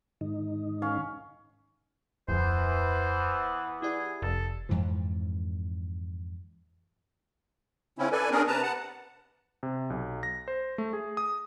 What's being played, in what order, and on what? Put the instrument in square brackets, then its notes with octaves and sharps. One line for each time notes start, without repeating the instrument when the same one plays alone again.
[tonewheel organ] G#2 D#3 D#4
[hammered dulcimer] C#4 F5
[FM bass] D1 [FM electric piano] F2 [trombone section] E3 B3 [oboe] C5
[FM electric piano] E4 G4 D5 [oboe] G#4
[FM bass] F1 [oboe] A4
[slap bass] F2 G#2 E3 F3
[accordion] C#3 C4 C#4 E4
A4 B4 D5 G#5
B3 C#4 D4 G#4 A#4
C3 B4 A5 A#5
F#5 A5
[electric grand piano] C3
B1
A#6
C5
A3
G#4
D#6